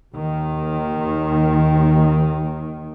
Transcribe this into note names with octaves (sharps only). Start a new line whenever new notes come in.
D#2 D#3